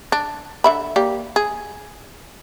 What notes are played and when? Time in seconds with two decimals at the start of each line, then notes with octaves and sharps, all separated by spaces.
0.12 D4
0.64 D3 E5 B5
0.96 A#3 G4 D5
1.36 G#4